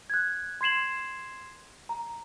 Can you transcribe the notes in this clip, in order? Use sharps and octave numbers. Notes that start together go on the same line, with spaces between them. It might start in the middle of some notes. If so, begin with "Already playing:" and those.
F#6 G#6
C6 G#6 C7 E7 F#7
A#5